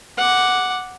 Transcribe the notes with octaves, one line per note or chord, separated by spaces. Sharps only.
F#5 D6